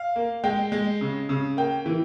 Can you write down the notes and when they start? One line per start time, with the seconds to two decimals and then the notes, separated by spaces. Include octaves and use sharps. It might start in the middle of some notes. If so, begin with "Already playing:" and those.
Already playing: F5
0.16 A#3
0.44 G#3 G5
0.72 G#3
1.01 C#3
1.29 C#3
1.57 A#3 G5
1.86 E3